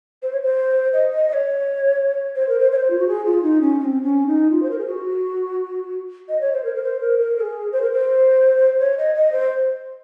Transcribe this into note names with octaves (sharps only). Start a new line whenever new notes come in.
C5
C#5
C5
D#5
D#5
D#5
C#5
C5
A#4
C5
C#5
C5
F4
F#4
G#4
F4
D#4
C#4
C#4
C4
C#4
D#4
F4
C5
A#4
G#4
F#4
D#5
C#5
C5
A#4
A#4
C5
A#4
A#4
A#4
G#4
C5
A#4
C5
C#5
D#5
D#5
C5